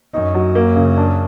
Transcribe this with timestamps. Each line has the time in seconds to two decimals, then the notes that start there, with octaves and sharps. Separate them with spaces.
0.13 F#2 D#4
0.34 F#3
0.55 A#3
0.76 C#3
0.97 D4